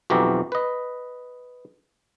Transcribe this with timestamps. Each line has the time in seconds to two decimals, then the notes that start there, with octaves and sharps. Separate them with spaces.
0.10 B1 F2 E3 F#4 G4 A#5
0.52 B4 D#5